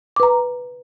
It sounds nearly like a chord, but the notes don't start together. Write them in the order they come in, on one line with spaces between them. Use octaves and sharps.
D6 B4 A#5